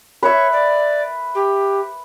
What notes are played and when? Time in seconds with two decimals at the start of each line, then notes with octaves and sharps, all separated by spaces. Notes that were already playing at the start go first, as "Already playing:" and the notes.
0.23 B4 C#5 E5
0.52 D5
1.35 G4